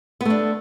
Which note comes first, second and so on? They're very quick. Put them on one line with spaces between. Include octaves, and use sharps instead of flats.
B3 A3 D4